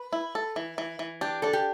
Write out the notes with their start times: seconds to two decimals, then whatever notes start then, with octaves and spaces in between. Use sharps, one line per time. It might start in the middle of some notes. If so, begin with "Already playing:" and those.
Already playing: B4
0.13 E4
0.35 A4
0.56 E3
0.78 E3
0.99 E3
1.21 D4 G4
1.42 D4 A4
1.53 G4